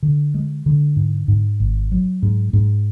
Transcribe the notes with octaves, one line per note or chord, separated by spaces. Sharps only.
D3
G#3
D3
G#2
G#2
G#1
F#3
G#2
G#2